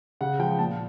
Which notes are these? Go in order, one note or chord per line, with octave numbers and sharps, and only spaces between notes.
C#3 F#5
F3 G#3 G5
A#2 A5